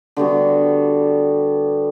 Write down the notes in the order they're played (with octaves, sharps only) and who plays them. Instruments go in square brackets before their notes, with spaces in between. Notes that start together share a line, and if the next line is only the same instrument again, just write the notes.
[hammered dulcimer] D3 G3 B3 F#4